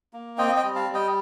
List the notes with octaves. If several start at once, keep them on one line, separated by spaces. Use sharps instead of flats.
A#3
C4 D#5 G5
D#5 G5
G3
F5 A5
G3
D#5 G5